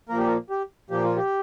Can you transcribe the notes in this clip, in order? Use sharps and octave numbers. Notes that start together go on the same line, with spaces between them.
A#2 F3 A#3 A#4
G4
A#4
G4
A#2 F3 A#3 G4
F4
G4